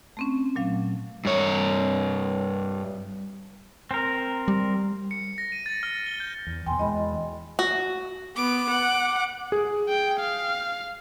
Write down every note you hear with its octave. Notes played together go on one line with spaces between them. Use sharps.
A3 C4 C#4
A#2 F#3 F5
G2 C#5
C4 A#4
G3
C#7
A#6
D#7
A6
F6
G7
G6
E2
E2 B2 G5 G#5 C6
E2 E3 G#3 D#5 B5
F#4
B3 D6
F#5
G#4
G5
F5